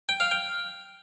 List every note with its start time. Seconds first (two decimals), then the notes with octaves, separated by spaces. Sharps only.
0.09 G5
0.20 F5
0.31 G5